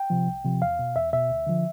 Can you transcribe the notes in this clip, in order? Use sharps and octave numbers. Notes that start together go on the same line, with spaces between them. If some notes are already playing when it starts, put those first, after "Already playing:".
Already playing: G5
C3 F3
C2
C3 F3
E2 F5
B2
E2 E5
B2 E5
D2
D3 F3